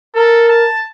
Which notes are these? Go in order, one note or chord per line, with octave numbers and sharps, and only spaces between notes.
A4 A#4
A5